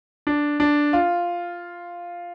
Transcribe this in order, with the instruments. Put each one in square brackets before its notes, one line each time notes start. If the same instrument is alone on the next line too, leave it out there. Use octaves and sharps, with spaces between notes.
[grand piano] D4
D4
F4